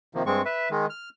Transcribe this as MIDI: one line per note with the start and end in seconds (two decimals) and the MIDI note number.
0.15 0.23 48
0.15 0.23 51
0.15 0.23 53
0.15 0.23 58
0.26 0.42 43
0.26 0.42 56
0.26 0.42 60
0.26 0.42 85
0.45 0.69 71
0.45 0.69 76
0.71 0.86 51
0.71 0.86 56
0.90 1.09 89